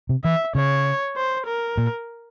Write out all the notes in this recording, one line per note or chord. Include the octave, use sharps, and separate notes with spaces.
C3
E3 E5
C#3 C#5
C5
A#4
A#2